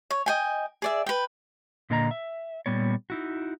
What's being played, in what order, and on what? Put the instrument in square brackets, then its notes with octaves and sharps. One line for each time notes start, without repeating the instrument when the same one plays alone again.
[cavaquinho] C#5
D#5 G5 G#5
G#4 D5 E5
B4 G5
[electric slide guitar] A#2 D3 A#3 D#5 G#5 A#5
E5
A#2 E3 G3 B3 C#5
D#4 E4 F#4